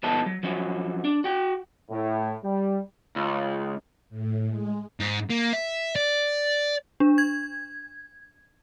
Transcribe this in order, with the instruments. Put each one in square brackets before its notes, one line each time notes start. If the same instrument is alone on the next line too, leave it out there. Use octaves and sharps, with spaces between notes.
[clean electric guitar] E2 A#2 B3 D#4 A4 A5
F#3
F3 F#3 C#4
D4
F#4 G5
[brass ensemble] A2
G3
[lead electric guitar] C#2
[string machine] A2
G#3
[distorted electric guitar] G#2
A#3
E5
D5
[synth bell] D4
G#6